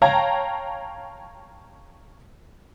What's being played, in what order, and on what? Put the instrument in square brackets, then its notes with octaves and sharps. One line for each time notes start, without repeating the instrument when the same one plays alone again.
[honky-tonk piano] C#5 F5 G5 A5 A#5 G#6